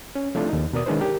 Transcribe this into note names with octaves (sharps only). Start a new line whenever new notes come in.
C#4
F3 A3 C4 D4 E4 F4
D#2 D#4
B2 A#4 D5 D#6
D#3 G#3 C#4 D4 B4 C5
G4 A#4